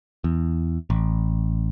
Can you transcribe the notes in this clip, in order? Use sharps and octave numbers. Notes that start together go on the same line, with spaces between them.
E2
A1